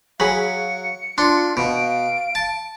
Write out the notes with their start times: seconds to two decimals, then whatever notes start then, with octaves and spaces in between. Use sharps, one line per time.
0.20 F#3 G#4 F5 B5 C#7
1.18 D4 F4 C6
1.57 B2 F5 D7
2.35 A5